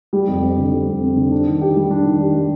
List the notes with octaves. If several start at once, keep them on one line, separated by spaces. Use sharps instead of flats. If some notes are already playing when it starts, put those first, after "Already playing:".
G3
F2
C4
D3
G3
F2
C4
D3
D4
D#3
G4
G3
D4
D#3
G4
G3